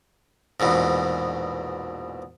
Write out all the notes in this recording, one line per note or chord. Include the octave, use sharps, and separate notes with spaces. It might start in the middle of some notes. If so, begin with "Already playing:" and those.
A#1 E2 G#2 B2